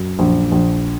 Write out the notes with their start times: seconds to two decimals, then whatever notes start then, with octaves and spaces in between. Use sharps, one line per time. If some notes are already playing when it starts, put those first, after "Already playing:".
Already playing: F#2
0.19 A#1
0.52 A#1